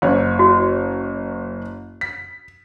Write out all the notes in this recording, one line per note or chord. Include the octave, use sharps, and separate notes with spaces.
F#1 C#5
F#4
B6